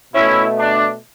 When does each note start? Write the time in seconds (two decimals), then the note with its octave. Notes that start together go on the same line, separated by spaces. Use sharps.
0.14 B2 A3 C#4 E4
0.57 D4